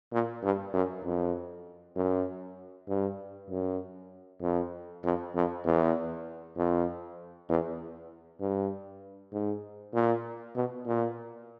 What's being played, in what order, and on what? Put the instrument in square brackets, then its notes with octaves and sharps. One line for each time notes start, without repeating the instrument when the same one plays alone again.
[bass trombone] A#2
G2
F#2
F2
F#2
G2
F#2
F2
F2
F2
E2
F2
E2
G2
G#2
A#2
B2
A#2